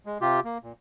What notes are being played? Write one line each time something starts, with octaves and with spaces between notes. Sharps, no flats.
G#3
C3 F4 G4
A#3
A#2